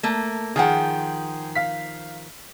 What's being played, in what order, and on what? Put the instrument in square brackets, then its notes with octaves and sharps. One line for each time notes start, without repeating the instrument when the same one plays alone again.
[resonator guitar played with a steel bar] A3 A#3
[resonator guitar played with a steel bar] D#3 F3 F#5 [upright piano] G#4 G5
[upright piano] F5 B6